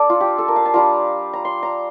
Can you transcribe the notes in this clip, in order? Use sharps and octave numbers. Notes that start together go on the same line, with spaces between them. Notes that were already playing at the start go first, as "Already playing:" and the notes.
Already playing: D4 A4 D5
F4
G4
A4
A#4
F5
A5
G3 D4 F4 A#5
A#5
C6
A#5